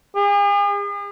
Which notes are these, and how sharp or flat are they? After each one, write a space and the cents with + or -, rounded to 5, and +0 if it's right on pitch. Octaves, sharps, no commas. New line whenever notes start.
G#4 -45